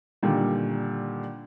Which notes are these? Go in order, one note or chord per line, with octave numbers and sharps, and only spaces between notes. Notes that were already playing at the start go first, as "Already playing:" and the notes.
A#2 D3 D#3 G3